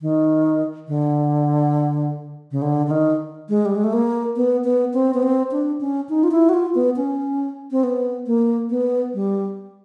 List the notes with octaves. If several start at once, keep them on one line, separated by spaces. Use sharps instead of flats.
D#3
D3
C#3
D3
D3
D#3
G#3
G3
G#3
A3
A#3
B3
B3
C4
B3
C4
D4
C#4
D#4
F4
E4
F#4
F4
B3
C#4
C4
B3
A#3
B3
G3